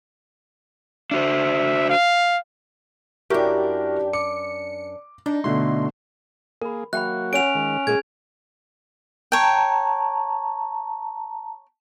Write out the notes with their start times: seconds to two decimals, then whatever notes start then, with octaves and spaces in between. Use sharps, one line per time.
1.11 D4 F#4 C5 E5
1.90 F5
3.30 F#2 D4 E4 F#4 G4 A#4
4.13 D6 C#7
5.26 D4 D#4
5.44 B2 D3 A3 C6
6.62 A#3 G#4 A#4 B5
6.93 F#3 A#3 F#4 E5 G5 B5 F#6
7.33 C#4 A#4 C#5 F#5 D7 F7
7.55 D#3 G#3
7.87 A#2 G#3 G#4 A#4 G#6
9.32 C#5 G5 A5 A#5